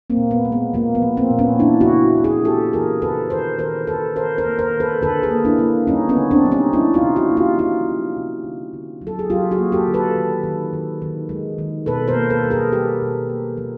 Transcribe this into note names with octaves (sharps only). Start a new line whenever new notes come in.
A#3 C4
A#2
B3
G#3
B3
F3 A#3
B3
F3
A#3 C4
A#2
B3 C#4
E3 D4 E4
E4 F#4
C#3
A3
F#4 G#4
A3 G4 A4
E3 G#4 A#4
C#3 A4 B4
D#3 A#4 C5
D#3 A#4 C5
D#3 A4 B4
D#3 A#4 C5
A#4 C5
A#3
A#4 C5
D#3
A4 B4
D3 A4 B4
G#4 A#4
A#3
D4 E4
A#3
G3 C#4 D#4
B3 C#4
D3
C4 D4
G3
C#4 D#4
F3 D4 E4
D#4 F4
C3
E4 F#4
A#3
F4 G4
F3 D#4 F4
F3
C3
D3
D3
F#3
A4
G#4
F#3 F4 G4
F#4 G#4
A#3
G4 A4
D3
A4 B4
D#3
D#3
D#3
D#3
G#3
D#3
B2 A4 B4
A#4 C5
A#3
A4 B4
G3
G#4 A#4
G3 G4 A4
B2
A#3
F3